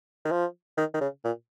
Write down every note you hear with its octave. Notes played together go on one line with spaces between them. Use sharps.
D#3
F3
D#3
D#3
C#3
A#2